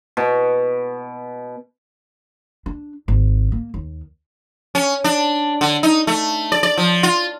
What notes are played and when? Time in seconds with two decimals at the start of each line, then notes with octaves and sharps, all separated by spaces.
0.17 B2
2.66 D4
3.08 G#1
3.52 A#3
3.74 D#2
4.75 C#4
5.04 D4
5.61 D3
5.83 D#4
6.07 A3
6.52 D5
6.63 D5
6.77 F3
7.03 F4